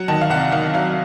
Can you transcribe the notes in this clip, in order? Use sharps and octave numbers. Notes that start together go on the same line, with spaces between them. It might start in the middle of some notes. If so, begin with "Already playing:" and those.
Already playing: F#3 F#5
D#3 A5
F5
C2 F#5
D#3 F5
F#3 F5